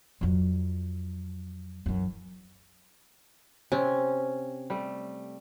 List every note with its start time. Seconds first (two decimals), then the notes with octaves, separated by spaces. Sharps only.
0.21 F2 F#3
1.86 F#2 E3
3.72 C3 C4 C#4
4.70 G3 A3